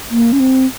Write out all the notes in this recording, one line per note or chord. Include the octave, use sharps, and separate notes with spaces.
A#3
C#4
C4